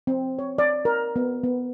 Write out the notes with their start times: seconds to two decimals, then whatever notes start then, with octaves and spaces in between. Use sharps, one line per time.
0.07 C4
0.39 C#5
0.58 D5
0.85 A#4
1.16 B3
1.44 B3